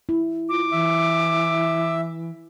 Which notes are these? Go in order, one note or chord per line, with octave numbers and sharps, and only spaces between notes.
E4
F4 D6
E3 E5